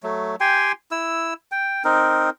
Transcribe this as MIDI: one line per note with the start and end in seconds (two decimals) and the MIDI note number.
0.03 0.36 54
0.03 0.36 57
0.40 0.72 67
0.40 0.72 79
0.40 0.72 80
0.40 0.72 84
0.91 1.34 64
0.91 1.34 88
1.52 1.83 79
1.85 2.30 60
1.85 2.30 63
1.85 2.30 70